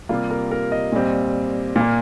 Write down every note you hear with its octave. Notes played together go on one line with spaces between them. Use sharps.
C3 G3 A#3 F4
A#4
A#4
D#5
A#2 G3 C4
A#2
A#3